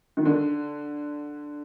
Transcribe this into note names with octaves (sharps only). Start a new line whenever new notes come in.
D#3
D3